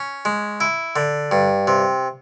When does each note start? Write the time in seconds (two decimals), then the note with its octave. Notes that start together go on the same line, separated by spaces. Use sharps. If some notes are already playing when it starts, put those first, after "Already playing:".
Already playing: C#4
0.25 G#3
0.60 E4
0.96 D3
1.31 G2
1.67 C3